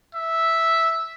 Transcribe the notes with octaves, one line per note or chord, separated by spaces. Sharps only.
E5